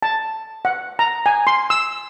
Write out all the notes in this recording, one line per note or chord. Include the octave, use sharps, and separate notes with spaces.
A5
F#5
A#5
G#5
C6
E6